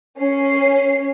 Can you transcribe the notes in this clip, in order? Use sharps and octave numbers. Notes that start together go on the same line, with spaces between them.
C#4 C7